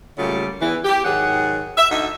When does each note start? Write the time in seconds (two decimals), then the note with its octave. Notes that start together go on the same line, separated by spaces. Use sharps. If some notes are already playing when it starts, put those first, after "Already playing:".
0.19 A#2 C#3 F#3 G3 A3 F4
0.62 E2 E3
0.85 G4
1.05 G#2 D#3 F#3 G#4 F#5
1.78 E5
1.91 D2 D#4 F#4 E5